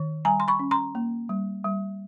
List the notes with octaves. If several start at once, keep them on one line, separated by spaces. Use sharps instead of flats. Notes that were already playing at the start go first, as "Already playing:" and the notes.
Already playing: D#3
G3 G#5 A#5
C6
B5 C#6
C#4
A#5 C6
A#3
G3
G3